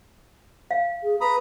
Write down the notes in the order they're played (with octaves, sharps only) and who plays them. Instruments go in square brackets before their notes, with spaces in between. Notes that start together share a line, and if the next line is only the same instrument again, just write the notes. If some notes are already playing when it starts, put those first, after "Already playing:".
[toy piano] F5
[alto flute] G#4
[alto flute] B4 [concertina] A#5 B5 D#6